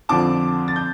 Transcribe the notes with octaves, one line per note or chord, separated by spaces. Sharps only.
F2 D3 F3 C4 A5 D6
A6
G6